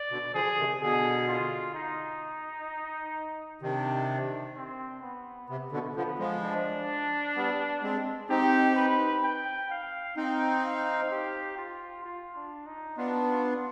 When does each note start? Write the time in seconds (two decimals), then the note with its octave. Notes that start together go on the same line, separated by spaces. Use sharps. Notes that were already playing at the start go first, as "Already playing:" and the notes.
Already playing: D5
0.11 B2 D3
0.34 D3 F3 G#4
0.58 C3 D#3
0.81 B2 D3 G#4
1.28 F4
1.74 D#4
3.61 C3 D#3 D4
4.56 C4
5.02 B3
5.48 C3 B3
5.72 B2 D3
5.96 D3 F3 B3
6.19 F3 G#3
6.43 D4
7.36 G3 B3
7.83 G#3 C4
8.29 C4 D#4 G4
8.76 B4
9.24 G5
9.70 F5
10.16 C4 D#4 G5
10.64 F5
11.10 G4
11.57 F4
12.04 F4
12.36 D4
12.66 D#4
12.97 B3 D4 F4
13.28 F4